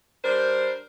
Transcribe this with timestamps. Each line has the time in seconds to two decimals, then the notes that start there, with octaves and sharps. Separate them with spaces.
0.23 G3 D4 A#4 C5